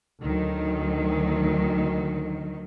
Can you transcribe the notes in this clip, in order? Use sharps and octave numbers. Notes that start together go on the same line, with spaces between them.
D2 D#3 F#3